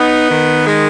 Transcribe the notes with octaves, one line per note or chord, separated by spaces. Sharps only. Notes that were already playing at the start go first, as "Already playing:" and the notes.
Already playing: B3 D#4
D#3
G#3